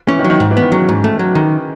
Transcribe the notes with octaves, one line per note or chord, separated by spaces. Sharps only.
E3 C#4
D#3
F#3
D#3
G#2
E3
D#3 B3
C#3 F#3
G#2
A3
F#3
D#3